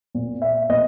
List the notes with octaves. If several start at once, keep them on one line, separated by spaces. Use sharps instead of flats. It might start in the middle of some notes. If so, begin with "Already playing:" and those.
A#2
E5
A#2 D#5